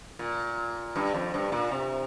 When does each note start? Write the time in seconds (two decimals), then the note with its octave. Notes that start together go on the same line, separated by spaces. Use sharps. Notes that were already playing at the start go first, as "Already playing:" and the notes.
0.19 A#2
0.96 G2
1.14 F2
1.34 G2
1.52 A#2
1.71 C3